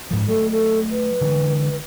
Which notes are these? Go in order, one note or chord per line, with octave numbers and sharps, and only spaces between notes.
G#2 F3
F#3 A3 A4
A4
B4
D3 E3 G#3